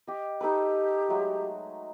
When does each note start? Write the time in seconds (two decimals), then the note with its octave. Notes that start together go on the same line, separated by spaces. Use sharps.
0.07 G4 D#5
0.41 D#4 G4 A4 B4
1.09 F#3 G#3 A3